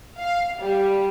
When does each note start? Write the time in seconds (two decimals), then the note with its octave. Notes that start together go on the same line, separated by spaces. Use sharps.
0.18 F5
0.61 G3